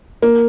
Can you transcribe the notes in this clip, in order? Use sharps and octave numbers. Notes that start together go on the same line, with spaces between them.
A#3